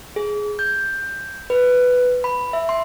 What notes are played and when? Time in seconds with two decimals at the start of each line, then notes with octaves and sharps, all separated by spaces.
0.16 G#4
0.59 G6
1.50 B4
2.24 B5
2.53 E5
2.69 C6